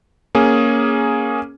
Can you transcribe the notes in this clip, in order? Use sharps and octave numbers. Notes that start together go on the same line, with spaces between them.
A#3 C#4 G#4